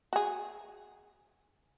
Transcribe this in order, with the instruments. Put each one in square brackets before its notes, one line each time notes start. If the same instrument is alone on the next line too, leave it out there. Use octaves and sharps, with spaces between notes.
[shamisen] F#4 G#4